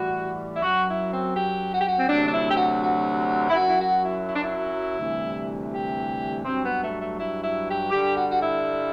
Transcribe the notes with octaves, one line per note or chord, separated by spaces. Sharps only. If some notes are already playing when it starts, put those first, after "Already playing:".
Already playing: A2 E3 G3 F#4
E4
F#2 F#3 F#4
E4
C4
G4
F#4
G4
F#4
C4
D2 C3 F#3 D4
D4
E4
G4
F#4
F#4
E4
F#2 F#3 F#4
E4
F#4
E4
E4
D4
E4
D2 C3 E3 G3
G4
G2 F#3 C4
B3
A3
A3
E4
E4
G4
G2 D3 G3 G4
F#4
F#4
E4